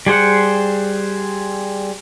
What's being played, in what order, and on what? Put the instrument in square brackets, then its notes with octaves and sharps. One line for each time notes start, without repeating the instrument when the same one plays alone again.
[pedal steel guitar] G3 G#4 C5 F#5